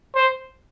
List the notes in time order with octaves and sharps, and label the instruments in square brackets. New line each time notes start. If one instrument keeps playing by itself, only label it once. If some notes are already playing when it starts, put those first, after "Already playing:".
[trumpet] C5